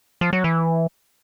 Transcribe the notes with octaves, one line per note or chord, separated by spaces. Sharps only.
F3
F#3
E3